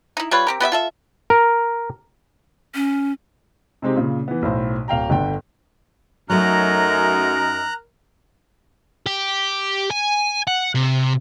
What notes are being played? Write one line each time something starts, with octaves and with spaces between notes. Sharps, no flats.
D#4 E4
G3 F4 B4 C#5
C4 G4 A#4
B3 G4 D#5 E5
F4 A4 E5
A#4
C#4
C3 G#3 C4 D#4 G4
A#2 C#3
E3 B3
B1 A2 C5
D1 F5 G5 A#5
G1 D3 G5
F#2 F#3 A3 D#4 A#4 A#5 F#6
G4
G#5
F#5
C3